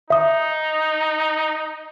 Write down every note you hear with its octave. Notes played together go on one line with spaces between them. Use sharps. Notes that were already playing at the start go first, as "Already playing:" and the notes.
D#4 E5 D#6